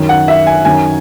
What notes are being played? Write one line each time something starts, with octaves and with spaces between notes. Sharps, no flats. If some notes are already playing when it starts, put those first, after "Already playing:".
Already playing: F#2 D#3
F#5
E5
G#5
F#2 D#3 G#5